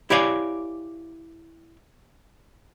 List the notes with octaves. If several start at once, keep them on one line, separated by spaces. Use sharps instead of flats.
E4 G4 C#5 D5 F5 G#5